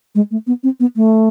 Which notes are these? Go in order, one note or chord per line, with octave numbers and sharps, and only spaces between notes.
G#3
A3
B3
C4
B3
A3